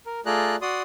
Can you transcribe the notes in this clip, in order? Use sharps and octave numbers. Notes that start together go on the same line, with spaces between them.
A#4
A3 F4 G#4 D5 A#5 F#6
F#4 D5 C6 D#6